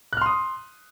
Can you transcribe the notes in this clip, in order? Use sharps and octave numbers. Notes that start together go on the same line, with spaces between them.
C6 D#6 F6 F#6